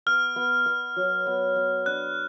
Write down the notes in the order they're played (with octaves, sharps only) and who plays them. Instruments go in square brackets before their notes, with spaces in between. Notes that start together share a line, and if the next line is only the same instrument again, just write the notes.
[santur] B3 [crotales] F6
[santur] B3
B3
F#3
B3
B3
[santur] D4 [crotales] F#6